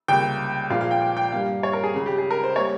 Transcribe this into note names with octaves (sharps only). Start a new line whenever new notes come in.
C#2 C3 G3 A#3 G5
A#2 F3 G#3 F5
F5
G5
G5
G5
G2 G3 A#3 F5
C#5
A#4
G#4
C#2 C#3 G#3
G4
G#4
A#4
C5
G3 A#3 C#5